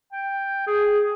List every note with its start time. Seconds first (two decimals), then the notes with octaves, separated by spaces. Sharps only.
0.12 G5
0.67 G#4